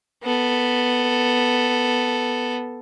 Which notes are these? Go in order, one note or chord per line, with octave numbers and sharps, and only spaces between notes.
B3 A4